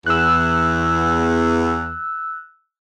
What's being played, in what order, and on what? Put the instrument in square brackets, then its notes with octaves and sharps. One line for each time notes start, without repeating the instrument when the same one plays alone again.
[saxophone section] E2 [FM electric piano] E6 F#6